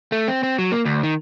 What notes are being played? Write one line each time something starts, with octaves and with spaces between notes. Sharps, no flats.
A3
C4
C4
F#3
A#3
D2
D#3